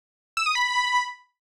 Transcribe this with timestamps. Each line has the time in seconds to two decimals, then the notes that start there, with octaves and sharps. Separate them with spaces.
0.37 E6
0.46 D#6
0.55 B5